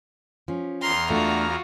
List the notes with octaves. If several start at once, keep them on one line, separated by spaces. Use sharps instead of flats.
F3 C#4
E2 A#5 C6 F6
A3 D4 F4 F#4